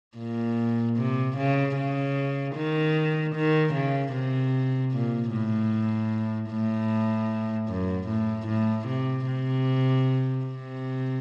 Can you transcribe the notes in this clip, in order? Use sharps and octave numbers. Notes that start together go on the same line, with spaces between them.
A#2
C3
C#3
C#3
D#3
D#3
C#3
C3
A#2
A2
A2
F#2
A2
A2
C3
C3
C3